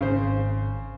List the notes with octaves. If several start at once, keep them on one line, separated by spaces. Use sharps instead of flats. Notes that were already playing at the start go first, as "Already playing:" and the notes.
G#1 C#3 C5